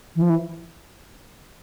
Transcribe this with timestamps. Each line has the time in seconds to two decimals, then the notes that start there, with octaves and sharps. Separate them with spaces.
0.16 E3
0.22 F3
0.30 E3